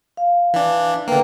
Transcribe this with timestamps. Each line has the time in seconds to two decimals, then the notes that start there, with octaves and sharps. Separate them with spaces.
0.17 F5
0.54 E3 D4
1.08 D3 A#3 B4 G5 A#5